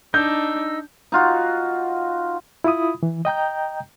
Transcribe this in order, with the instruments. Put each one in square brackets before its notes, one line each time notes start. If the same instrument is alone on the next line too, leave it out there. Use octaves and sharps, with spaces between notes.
[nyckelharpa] D4 [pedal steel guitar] D#4 [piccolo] E6 [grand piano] G6
[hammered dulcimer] D#4 F4 F#4
[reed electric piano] E4 F4 B5 D#6
E3
D#5 G5 A#5 G6